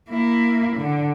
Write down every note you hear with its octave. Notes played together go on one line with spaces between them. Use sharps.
A#3 E4
D3